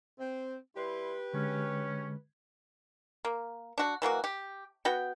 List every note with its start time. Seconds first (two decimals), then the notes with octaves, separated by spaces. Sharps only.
0.19 C4
0.77 G3 E4 G4 B4 C6
1.33 D3 G#3 C#4
3.25 A#3
3.78 D4 F#4
4.02 E3 F#3 A#3 F#4
4.24 G4
4.85 B3 F#4 G5